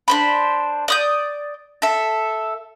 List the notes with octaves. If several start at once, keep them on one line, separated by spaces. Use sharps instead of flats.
D4 C5 B5
D5 D#6 G6
A4 E5